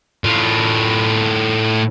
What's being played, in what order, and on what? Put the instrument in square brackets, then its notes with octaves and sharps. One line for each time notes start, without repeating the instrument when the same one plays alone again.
[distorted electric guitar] A2 F4